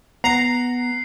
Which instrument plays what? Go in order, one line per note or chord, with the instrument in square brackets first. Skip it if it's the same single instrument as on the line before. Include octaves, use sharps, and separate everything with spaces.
[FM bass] B3 [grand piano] F#5 [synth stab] A#5 [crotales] C7